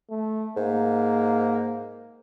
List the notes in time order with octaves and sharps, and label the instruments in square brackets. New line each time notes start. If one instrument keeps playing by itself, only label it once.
[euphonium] A3
[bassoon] G#2 [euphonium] A#3